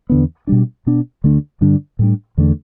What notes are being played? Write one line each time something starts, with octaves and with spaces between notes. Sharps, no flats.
E2 D3 B3
B2 G3 D4
B2 B3 D4
D2 D3 A3 D4
G2 D3 G3 D4
A2 G3 D4
E2 D3 A3 D4